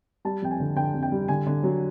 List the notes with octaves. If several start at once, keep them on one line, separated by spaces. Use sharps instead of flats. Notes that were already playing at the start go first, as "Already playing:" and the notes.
G3 A5
F2 G5
G#5
D3
D3 G5
F2
G5
G3
D3 G#5
D3
F#3